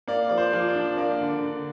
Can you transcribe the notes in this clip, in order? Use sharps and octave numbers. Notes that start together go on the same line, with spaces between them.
A#3 D5
F3 D5
C5
F3
D5
D4
A#3 D5
D3
D3